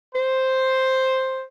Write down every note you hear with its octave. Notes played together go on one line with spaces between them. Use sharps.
C5